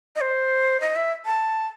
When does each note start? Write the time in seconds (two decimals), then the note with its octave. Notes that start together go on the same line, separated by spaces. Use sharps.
0.16 D#5
0.21 C5
0.80 D#5
0.96 E5
1.26 A5